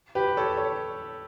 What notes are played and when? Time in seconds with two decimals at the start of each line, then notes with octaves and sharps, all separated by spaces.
0.15 G4 B4
0.37 A4 C#5
0.57 A4 C#5